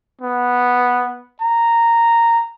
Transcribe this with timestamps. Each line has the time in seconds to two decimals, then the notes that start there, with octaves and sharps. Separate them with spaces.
0.21 B3
1.42 A#5